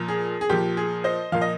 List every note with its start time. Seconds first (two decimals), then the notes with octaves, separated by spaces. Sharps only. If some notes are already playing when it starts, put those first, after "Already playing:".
Already playing: A#2 F3
0.08 G#4
0.41 G#4
0.49 A#2 F3 G4
0.77 G#4
1.04 C5 D#5
1.32 A#2 F3 F5
1.41 D#5